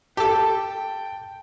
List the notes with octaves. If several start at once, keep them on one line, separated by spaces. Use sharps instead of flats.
G4 A4 G5 A5